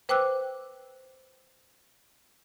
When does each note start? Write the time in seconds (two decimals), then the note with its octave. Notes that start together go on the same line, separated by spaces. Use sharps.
0.09 B4 C5 G5 D6 E6 F#6